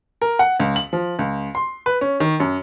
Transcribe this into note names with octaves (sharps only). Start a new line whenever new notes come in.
A#4
F#5
C#2
F#7
F3
C#2
C6
B4
C#4
D#3
F#2